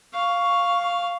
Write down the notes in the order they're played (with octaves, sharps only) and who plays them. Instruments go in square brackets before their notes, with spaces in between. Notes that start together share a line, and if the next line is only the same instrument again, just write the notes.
[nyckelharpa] F5 [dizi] C#6